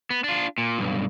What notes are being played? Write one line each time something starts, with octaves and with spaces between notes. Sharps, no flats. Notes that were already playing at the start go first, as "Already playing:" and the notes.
B3
D4 F4
A#2
B1 G2